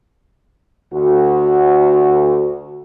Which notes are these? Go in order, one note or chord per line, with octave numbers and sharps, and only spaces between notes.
D2 F#4